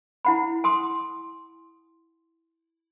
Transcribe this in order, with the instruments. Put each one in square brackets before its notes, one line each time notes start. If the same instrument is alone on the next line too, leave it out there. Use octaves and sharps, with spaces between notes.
[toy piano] E4 F#5 B5
G#5 C6 D#6